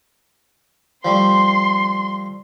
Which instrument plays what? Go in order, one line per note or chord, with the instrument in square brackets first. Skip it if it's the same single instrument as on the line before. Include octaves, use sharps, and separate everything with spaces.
[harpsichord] F3 G3 A3 [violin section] C6